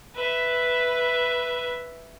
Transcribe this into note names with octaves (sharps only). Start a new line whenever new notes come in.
B4 E5